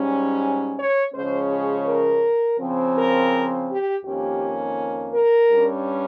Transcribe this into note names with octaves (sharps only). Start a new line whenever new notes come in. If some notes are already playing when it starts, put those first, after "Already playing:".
Already playing: G#2 G3 C#4
C#5
C#3 F3 G#3 C#4 C5
G#4
A#4
C#3 F3 C4
A#4
G4
F2 D#3 A#3 C#4 G4
A#4
G2 G3 C#4